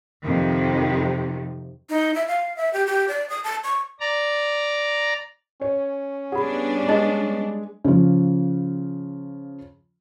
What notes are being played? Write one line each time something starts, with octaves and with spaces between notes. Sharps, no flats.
F2 C3 D#3
D#4
E5
F5
E5
G4
G4
D5
D#6
A5
C#6
D5 A#5
C#4 C#5
G3 B3 D4 G#4 F#5 B5
G#3 D#5 A5 A6
C#3 F3